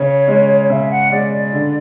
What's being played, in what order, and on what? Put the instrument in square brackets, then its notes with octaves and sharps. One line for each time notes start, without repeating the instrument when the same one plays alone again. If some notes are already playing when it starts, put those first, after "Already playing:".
Already playing: [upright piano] C#3 [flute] C#5
[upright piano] G#3 C#4
[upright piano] C#3 [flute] E5
[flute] F#5
[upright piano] G#3 C#4 [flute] D5
[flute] D5
[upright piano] D3